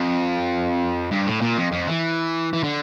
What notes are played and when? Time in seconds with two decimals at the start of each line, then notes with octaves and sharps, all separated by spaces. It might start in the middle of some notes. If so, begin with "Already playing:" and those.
Already playing: F2
1.11 G2
1.26 A2
1.41 A#2
1.57 F2
1.72 F2
1.88 E3
2.53 E3
2.64 D3